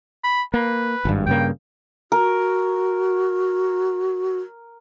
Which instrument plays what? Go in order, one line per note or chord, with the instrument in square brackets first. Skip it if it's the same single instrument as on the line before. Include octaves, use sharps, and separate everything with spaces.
[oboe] B5
[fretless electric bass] A#3 [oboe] B4
[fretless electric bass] G#1 G2
[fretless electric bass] G2 C#3 A#3 [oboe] G5
[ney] F#4 [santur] A#4